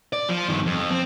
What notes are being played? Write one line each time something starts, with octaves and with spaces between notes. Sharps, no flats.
D5
F3
G2 D#3
F2
C4